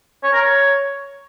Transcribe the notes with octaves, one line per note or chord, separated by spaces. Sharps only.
C#5
A#4
C#5